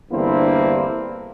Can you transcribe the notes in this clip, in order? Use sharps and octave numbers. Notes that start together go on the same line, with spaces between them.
E2 G2 D3 A#3 C4 E4